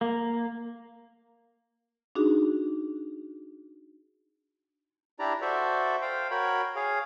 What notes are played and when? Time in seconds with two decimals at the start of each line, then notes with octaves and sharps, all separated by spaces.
0.01 A#3
2.15 D4 D#4 F#4 G#4
5.19 D4 E4 G4 D5 A#5
5.41 F#4 A4 C5 D5 E5
6.02 C5 F5 G5
6.31 F#4 A#4 C#5 G5 B5
6.76 G#4 C#5 F5